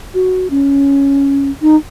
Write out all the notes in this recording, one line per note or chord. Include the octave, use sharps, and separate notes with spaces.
F#4
C#4
D#4